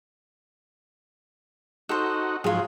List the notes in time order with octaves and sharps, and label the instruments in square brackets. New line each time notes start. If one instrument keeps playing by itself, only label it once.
[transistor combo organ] D#4 F#4 [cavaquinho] A4 C5
[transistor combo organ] G#2 F3 F#3 [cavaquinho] F4 G#4